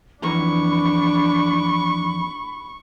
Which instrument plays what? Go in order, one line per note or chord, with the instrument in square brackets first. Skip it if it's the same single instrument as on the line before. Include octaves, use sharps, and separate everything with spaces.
[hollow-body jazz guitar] F2 E3 A#5 [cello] D4 [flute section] B5 [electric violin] C#6